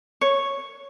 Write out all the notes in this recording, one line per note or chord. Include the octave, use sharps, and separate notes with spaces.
C#5